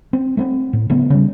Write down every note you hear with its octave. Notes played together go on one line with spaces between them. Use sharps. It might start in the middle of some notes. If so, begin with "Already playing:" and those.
C4
A3 A#3 C4
A2
C#3 F#3 A3 B3
C#3 G3